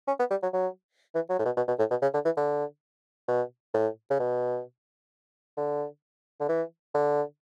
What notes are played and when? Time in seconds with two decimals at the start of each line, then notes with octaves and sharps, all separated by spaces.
0.07 C#4
0.19 B3
0.30 G3
0.43 F#3
0.53 F#3
1.15 E3
1.30 F#3
1.39 A2
1.45 B2
1.57 B2
1.68 B2
1.79 A2
1.90 B2
2.02 C#3
2.14 D3
2.25 E3
2.37 D3
3.28 B2
3.74 A2
4.10 C#3
4.19 B2
5.57 D3
6.40 D3
6.49 E3
6.94 D3